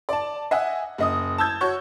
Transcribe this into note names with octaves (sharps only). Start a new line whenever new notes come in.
D5 A5
D#5 E5 F#5 G#5
F#1 D#5 D#6
A5 E6 G6 G#6
F#4 C#5 C#6 G6